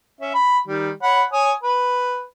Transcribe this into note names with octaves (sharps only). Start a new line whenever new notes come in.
C#4 E5
B5
D#3 G3
C#5 F#5 B5
C#5 G#5 D#6
B4